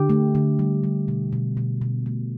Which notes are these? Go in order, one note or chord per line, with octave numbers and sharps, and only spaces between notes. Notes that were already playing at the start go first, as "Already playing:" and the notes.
Already playing: D3 G4
A3
D3
G3
G3
B2
B2
B2
B2
A3